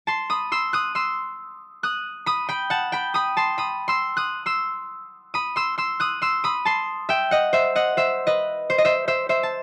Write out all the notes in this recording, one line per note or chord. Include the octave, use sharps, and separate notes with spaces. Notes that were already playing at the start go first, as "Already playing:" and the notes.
A5 C6
B5 D#6
C6 E6
D#6 F#6
C6 E6
D#6 F#6
B5 D#6
G5 B5
F#5 A5
G5 B5
B5 D#6
A5 C6
B5 D#6
C6 E6
D#6 F#6
C6 E6
B5 D#6
C6 E6
C6 E6
D#6 F#6
C6 E6
B5 D#6
A5 C6
E5 G5
D#5 F#5
C5 E5
D#5 F#5
C5 E5
B4 D#5
C5
D#5
C5 E5
C5 E5
C5 E5
A5